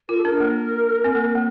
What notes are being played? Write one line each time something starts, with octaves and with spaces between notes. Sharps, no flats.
F4 A#4
A4
D4 A#4
A#3
C4
A#3
A#3